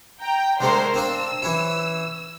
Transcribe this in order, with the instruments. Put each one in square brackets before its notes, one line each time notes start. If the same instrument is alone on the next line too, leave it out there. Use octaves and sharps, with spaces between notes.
[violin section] G5 A#5
[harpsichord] D3 G#3 A3 [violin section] A#4 C5 C6
[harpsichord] C4 D4 F5 [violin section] E6
[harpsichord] E3 C#4 E4